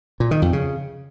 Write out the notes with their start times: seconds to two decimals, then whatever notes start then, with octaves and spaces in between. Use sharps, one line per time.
0.20 A#2
0.31 D#3
0.42 F2
0.53 C#3